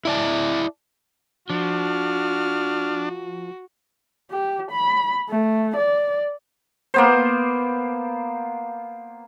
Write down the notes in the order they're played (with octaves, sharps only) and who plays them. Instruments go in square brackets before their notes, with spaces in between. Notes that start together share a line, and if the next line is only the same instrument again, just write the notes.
[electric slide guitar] E4 D5 A5
[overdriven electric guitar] F3 [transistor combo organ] D4 [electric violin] F#4 [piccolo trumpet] F6
[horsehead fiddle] G4
B5
A3
D5
[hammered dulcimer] A#3 B3 C5